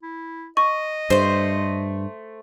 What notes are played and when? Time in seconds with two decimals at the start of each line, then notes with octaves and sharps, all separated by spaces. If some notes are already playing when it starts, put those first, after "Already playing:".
0.03 E4
0.57 D#5 C#6
1.10 G2 A3 C5